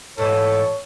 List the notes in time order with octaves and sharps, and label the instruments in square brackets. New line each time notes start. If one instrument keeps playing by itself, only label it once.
[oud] G#2 E3 [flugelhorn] A4 [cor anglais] C#5